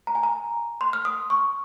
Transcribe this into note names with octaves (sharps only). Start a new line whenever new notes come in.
A#5
G#5
A#5
C6
F6
D#6
C#6